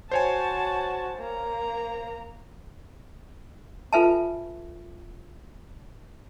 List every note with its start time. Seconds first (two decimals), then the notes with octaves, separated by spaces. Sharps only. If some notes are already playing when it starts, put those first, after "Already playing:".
0.11 F#4 C5 C#5 G#5 A5
1.18 A#3 A#5
3.93 F4 A4 B4 E5 G#5 A5